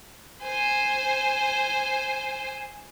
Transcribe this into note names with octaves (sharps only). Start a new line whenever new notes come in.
C5 G#5